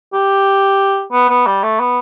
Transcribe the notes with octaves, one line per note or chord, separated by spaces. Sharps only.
G4
B3
B3
G3
A3
B3